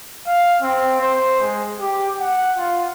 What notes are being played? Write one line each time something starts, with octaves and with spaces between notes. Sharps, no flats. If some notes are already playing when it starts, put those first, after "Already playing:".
F5
C4
C5
G#3
G4
F#5
F4